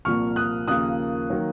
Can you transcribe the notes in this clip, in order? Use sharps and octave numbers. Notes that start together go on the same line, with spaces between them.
C2 A#2 F3 A#3 C#6 F6
D#6 F#6
D#2 C#3 F3 A#3 D#6 F#6
D#3 F#3 A#3